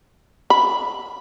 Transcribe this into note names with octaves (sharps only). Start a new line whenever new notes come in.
B5